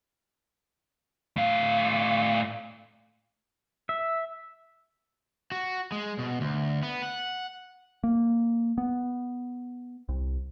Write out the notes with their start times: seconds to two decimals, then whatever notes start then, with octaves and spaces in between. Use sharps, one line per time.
1.37 A2 F5
3.89 E5
5.52 F#4
5.92 G#3
6.19 B2
6.41 D2
6.83 B3
7.02 F#5
8.04 A#3
8.78 B3
10.09 C2